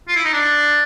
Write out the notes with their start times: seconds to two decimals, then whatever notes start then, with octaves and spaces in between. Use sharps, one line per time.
0.08 F4
0.16 E4
0.25 D#4
0.33 D4